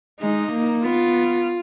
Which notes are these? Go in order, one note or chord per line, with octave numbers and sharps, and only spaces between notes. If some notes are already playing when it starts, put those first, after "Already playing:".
G#3 D#4
A#3
B3 F4